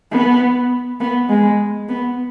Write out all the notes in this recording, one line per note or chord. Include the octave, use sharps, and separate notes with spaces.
B3
B3
G#3
B3